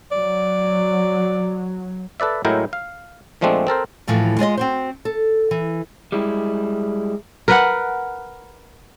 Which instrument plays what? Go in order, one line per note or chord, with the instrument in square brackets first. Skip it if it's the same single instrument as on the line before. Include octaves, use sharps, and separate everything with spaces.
[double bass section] F#3 [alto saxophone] D5
[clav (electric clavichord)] A4 B4 D5 E5
A2 F#3 G#3 E4 A#4 G5
F5
A#2 F3 G#3 A3 C4 D4
C4 A4 A#4 C5
[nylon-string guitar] D#2 A2 E3 F3 A3
G#3 F4 D5 D#5
C4 F#4 C5
A4
E3
[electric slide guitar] G3 G#3 E4
[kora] A#4 B4 F#5